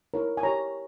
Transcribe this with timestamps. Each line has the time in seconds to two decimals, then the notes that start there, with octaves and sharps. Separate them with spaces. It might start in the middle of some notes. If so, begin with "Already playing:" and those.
0.14 E4 A#4 C#5
0.37 G#5
0.43 G4 C#5 A#5